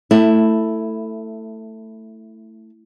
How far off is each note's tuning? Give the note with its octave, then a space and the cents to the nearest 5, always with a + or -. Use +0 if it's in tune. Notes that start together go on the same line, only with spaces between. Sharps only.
A3 +15 E4 +0